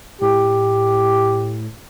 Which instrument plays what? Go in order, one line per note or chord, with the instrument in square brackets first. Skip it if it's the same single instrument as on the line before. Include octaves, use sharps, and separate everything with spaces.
[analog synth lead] A2 [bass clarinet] G4